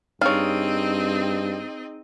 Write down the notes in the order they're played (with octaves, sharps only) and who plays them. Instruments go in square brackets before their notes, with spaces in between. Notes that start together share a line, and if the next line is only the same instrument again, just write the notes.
[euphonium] G2 [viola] C4 D#5 [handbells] D#4 G#4 [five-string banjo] C#5 F5